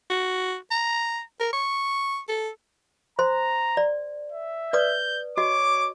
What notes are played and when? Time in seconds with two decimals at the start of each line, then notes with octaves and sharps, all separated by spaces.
0.10 F#4
0.71 A#5
1.40 A#4
1.53 C#6
2.29 A4
3.19 C5 A#5 C6
3.77 D5
4.32 E5
4.73 B4 D5 D#6 G6
5.37 F#4 C#5 D#5 D6